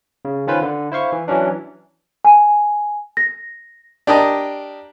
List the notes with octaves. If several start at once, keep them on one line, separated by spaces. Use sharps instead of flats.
C#3
D#3 C#4 F4 B4 C5
D3
E4 C5 F5 C#6
E3
E3 F#3 C#4 D4
G#5
A#6
D4 G4 A#4 D#5 A5 A#5